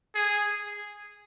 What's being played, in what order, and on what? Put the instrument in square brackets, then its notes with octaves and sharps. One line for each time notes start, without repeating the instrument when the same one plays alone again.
[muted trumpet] G#4